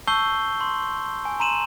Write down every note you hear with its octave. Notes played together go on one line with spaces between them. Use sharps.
A5 C#6 E6 G6 C7 G7
C6
G#5
A#5 C6 D#7 E7 F#7